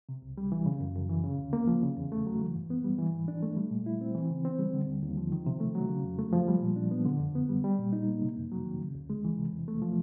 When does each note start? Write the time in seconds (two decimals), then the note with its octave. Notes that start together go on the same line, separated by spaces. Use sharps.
0.09 C3
0.22 C2
0.38 G3
0.52 E3
0.66 C#3
0.80 F#2
0.96 F#2
1.09 E3
1.24 C#3
1.39 D2
1.53 A#3
1.67 F3
1.83 C#3
1.97 E2
2.12 A3
2.26 F#3
2.41 E3
2.55 G2
2.70 B3
2.84 G3
2.98 E3
3.14 G#2
3.28 D4
3.43 A3
3.56 G3
3.71 A#2
3.86 E4
4.01 C4
4.15 E3
4.30 C#3
4.45 C4
4.59 G3
4.73 D3
4.87 D#2
5.02 D#2
5.17 F3
5.32 D#3
5.46 C3
5.60 A3
5.75 F#3
5.89 C#3
6.04 F2
6.18 A3
6.33 F3
6.48 G3
6.62 A#2
6.76 D4
6.91 B3
7.05 D3
7.20 F2
7.35 B3
7.49 G3
7.64 G3
7.79 A#2
7.93 D#4
8.08 A#3
8.22 C3
8.36 F2
8.52 F#3
8.65 D#3
8.80 C#3
8.95 D2
9.10 G#3
9.25 E3
9.38 C3
9.53 E2
9.68 A3
9.82 F3